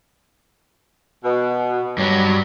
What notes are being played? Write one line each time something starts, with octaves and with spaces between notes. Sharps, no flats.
B2
G2 F#3 G3